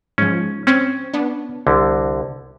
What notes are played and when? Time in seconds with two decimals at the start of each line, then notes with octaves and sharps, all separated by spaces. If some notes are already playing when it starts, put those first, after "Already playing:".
0.18 G#2 F3 C#4
0.67 C4 C#4
1.13 B3 D4
1.67 C2 D3